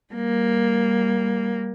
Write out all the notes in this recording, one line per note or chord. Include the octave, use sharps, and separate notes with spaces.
G3 A#3